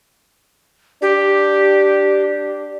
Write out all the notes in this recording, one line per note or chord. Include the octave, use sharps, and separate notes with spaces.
D4 G4